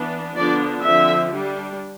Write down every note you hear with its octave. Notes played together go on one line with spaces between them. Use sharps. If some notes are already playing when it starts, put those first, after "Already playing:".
Already playing: E3 B3 D4
D3 F3 B3 D4 D5
D3 F3 C4 E5
G3 D4